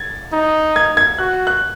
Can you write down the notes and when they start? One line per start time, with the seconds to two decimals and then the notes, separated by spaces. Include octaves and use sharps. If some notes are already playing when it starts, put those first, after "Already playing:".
Already playing: G#6 A6
0.33 D#4
0.76 G#6
0.97 G#6
1.18 F#4 F#6
1.47 F#6